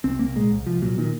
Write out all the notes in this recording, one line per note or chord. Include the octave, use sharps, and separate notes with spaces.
C2 C4
C2 A#3
A#2 G#3
C2
C2 F3
A#2 F#3
A#2 D#3